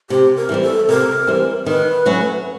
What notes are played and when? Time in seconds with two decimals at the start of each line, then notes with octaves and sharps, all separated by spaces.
0.10 C3 G4
0.36 A#4
0.49 E3 G3 C4
0.63 A4
0.89 C3 A#4
1.27 E3 G3 C4
1.66 D#3 B4
2.06 F#3 A3 C#4 F#4